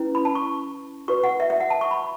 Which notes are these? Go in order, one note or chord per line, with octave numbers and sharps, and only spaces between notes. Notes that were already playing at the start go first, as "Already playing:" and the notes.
Already playing: C#4 E4 B4
B5
A5
C#6
F#4 B4 C#6
F#5
E5
E5
F#5
A5
C#6
B5